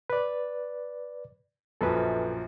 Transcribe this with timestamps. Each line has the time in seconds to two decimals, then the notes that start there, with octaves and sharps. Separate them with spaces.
0.10 B4 D5
1.81 A#1 F#2 F3 A4 B4